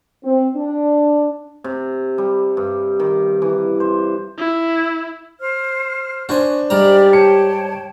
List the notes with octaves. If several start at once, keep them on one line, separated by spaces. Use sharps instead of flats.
C4
D4
C3
G3
G2
D#3
E3
C5
E4
C5 F6
D4 F#4 C5 G#5
G#2 G3 G4 D5 A#5 F6
C#5 G5 A5 C#7